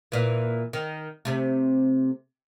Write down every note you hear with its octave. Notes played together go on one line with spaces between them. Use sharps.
A#2 E3
D#3
C3 A3